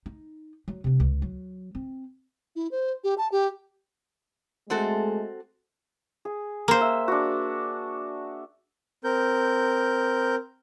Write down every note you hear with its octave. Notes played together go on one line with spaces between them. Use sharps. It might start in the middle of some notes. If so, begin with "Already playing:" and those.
D#4
F#3
C3 D4
C#2
F#3
C4
E4
C5
G4
A5
G4
G#3 A3 C4 F#4 A4
G#4
A#3 C5
E5
D4 F#4
C4 A#4 G6